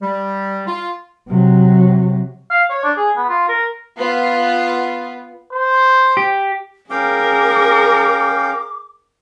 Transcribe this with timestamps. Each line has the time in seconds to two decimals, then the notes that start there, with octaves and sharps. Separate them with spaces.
0.02 G3
0.67 F4
1.29 C3 F#3
2.51 F5
2.70 C#5
2.84 D4
2.97 G#4
3.17 B3
3.29 F4
3.48 A#4
3.97 B3 F4
5.53 C5
6.17 G4
6.90 C#4 G#4 A#4 F5 G5 D6